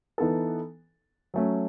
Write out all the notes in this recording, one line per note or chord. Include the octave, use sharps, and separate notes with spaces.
E3 B3 D#4 A4
F#3 A3 C#4